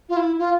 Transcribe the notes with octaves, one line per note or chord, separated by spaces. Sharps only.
F4
E4
F4